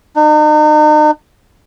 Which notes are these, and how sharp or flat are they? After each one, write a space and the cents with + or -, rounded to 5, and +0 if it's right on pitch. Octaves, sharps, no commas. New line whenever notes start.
D#4 -40